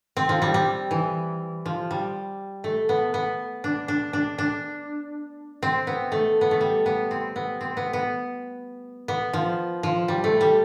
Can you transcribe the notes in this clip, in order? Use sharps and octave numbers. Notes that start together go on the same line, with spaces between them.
C4
F3
G3
G3
E3
F3
G3
A3
B3
B3
D4
D4
D4
D4
C4
B3
A3
B3
A3
G3
B3
C4
B3
C4
B3
B3
B3
F3
F3
G3
A3
G3